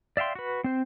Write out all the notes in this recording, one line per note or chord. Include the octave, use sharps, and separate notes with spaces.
D5 E5 F5 G5 C6
F#4 B4
C4 C5